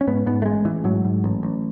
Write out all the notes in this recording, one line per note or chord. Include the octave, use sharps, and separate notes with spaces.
C#4
G#2 B3
G#2 B3
A3
A1 G#3
A1 E3
G#2 F#3
G#2
A1
A1